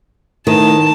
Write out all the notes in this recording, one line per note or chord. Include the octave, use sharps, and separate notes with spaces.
A2 D#3 A5